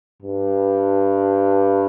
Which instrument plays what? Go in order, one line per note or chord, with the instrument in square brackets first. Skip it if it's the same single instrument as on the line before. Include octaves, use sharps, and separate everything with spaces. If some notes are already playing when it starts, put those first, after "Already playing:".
[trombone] G2